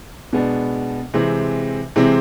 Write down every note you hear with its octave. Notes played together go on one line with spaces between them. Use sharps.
B2 G#3 B3 D4
C3 E3 G#3 C4
C3 E3 G#3 C4